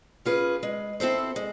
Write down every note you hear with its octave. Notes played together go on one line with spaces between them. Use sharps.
C#4 F4 G#4 B4
G#3
C4 E4 A4 C5
G#3